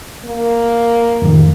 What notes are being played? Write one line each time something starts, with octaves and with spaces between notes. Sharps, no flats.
A#3
F2 A2 D#3